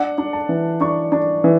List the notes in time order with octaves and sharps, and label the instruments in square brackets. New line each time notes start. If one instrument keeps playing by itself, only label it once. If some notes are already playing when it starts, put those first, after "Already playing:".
Already playing: [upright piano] D4 F#5
D4
A5
E3
D4 C#6
D4
E3